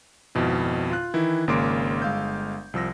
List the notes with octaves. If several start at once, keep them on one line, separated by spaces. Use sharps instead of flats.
G#1 F2 B2 E4
F4 F#6
D#3 E3 E4
G#1 C#3 A#3 C6 D6 D7
G1 G#3 F5 E6 G6
C2 F3 E6 A#6